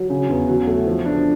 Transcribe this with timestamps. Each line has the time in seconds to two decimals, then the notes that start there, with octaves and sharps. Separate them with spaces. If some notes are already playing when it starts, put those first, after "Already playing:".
Already playing: F#3
0.10 C#3
0.29 E2
0.49 F#3
0.67 A3
0.87 F3
1.06 D4